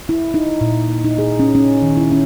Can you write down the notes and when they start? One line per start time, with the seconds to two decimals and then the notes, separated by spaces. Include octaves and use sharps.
0.09 E4
0.34 D#4
0.61 A#2
1.04 D#4
1.18 G#4
1.39 C#4
1.55 C#4
1.82 D#3
1.97 E4
2.12 C#4